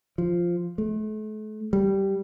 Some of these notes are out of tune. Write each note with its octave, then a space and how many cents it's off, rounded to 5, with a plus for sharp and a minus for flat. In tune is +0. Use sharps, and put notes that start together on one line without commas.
F3 -5
A3 -40
G3 -5